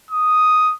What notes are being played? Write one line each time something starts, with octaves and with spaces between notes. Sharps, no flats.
D#6